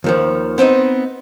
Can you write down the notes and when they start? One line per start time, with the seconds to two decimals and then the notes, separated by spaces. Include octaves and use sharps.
0.04 D#2 D#3 F3
0.58 B3 C4 D4 D#4